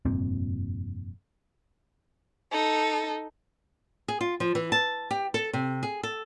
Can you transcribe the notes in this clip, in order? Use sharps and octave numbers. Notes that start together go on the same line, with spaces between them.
F1 G2 A#2 C4
D#4 A4
G#4
F4
F3
E3
A5
G4
A4
C3
G#4
A4